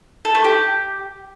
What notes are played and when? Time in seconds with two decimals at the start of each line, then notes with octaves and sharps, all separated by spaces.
0.25 A4
0.35 A3
0.44 G4